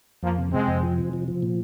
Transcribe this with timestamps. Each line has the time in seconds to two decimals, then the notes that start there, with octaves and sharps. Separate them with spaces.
0.23 F2 F3 A#3
0.38 C3
0.52 C3 G#3 C4
0.68 F2
0.83 F3
0.98 C3
1.13 F3
1.28 F3
1.43 A#2